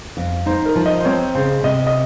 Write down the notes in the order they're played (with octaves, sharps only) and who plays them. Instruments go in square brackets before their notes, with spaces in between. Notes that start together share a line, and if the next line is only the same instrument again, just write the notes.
[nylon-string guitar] F2
[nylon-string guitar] D#4 [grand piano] C5
[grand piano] A#4
[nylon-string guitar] F3
[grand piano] D#5
C5
[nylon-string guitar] C4 [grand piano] C#5
[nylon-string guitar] C#3 [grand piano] C5
[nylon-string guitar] C3 [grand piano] D#5
[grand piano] D#5